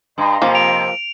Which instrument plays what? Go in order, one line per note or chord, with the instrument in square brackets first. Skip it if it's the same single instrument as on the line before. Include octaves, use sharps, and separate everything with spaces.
[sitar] G2 [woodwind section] D#5 A#5 C6
[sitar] F2 C3 [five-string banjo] F3 A#3
[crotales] D7 F7